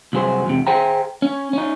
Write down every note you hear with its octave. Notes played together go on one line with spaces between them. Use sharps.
C2 F#2 F#3 G#4 C5
E2 C3
G#4 C5 G5 A#5
C#4
C#4 D#4